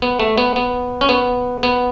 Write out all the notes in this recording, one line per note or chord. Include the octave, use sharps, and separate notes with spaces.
B3
A3
B3
B3
C#4
B3
B3